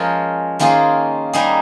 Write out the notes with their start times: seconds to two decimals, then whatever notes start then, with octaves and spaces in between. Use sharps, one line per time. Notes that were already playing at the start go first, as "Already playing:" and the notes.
Already playing: F3 G#3 C#4 F4 A#4
0.59 D#3 A#3 C#4 F4 G#4
1.33 G3 A#3 D#4 G#4